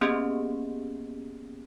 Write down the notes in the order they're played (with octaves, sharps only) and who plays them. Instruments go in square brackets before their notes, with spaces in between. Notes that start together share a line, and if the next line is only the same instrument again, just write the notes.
[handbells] A#3 B3 C#4 G4 G#4